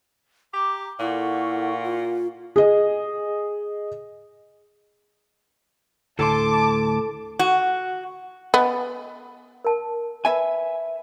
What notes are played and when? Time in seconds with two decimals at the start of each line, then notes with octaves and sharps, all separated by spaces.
0.53 G4 A#5 D6
1.00 A#2 E4 A4 F#5 C#6
1.85 F4
2.56 G#4 D#5
6.19 D2 A2 A4 A5 C6 D6
7.39 F#4
8.54 B3 D#5 G#5
9.65 A#4 A5
10.25 B4 E5 G#5